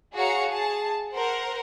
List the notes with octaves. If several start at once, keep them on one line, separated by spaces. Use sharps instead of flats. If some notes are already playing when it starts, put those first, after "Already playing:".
F#4 G#4 C#5 F5 A#5 C#7
G#4 A5
A#4 C5 F#5